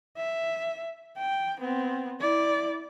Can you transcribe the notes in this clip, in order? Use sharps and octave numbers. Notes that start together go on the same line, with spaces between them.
E5
G5
B3 C4
E4 D5